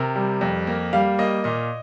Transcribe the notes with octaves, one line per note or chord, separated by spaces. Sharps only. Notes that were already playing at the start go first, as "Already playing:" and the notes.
Already playing: C3 A#4
G3
F2
A#3
G3 F5
A#3 D#5
A#2 D#5